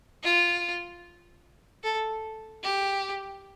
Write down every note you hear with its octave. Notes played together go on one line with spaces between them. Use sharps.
F4
A4
G4